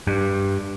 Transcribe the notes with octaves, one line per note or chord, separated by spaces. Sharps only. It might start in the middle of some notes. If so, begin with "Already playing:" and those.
G2